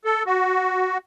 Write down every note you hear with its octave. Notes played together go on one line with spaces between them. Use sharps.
A4
F#4